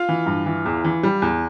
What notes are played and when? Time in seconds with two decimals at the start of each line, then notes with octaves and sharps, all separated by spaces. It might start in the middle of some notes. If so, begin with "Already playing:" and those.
Already playing: F4 F5
0.09 E3
0.26 G2
0.46 E3
0.65 E2
0.84 E3
1.03 G3
1.22 E2